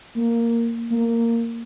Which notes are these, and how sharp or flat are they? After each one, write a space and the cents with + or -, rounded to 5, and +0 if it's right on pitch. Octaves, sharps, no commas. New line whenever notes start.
A#3 -5
A#3 -10